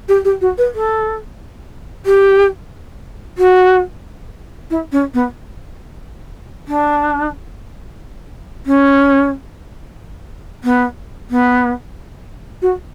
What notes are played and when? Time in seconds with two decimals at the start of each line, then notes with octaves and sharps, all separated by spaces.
0.08 G4
0.24 G4
0.41 F#4
0.57 B4
0.74 A4
2.06 G4
3.38 F#4
4.70 E4
4.92 C#4
5.14 B3
6.67 D4
8.65 C#4
10.63 B3
11.30 B3
12.61 F#4